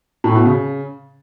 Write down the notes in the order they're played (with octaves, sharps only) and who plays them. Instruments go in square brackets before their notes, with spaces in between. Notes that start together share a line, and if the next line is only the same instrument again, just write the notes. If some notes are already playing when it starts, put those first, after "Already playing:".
[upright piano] A2
B2
C#3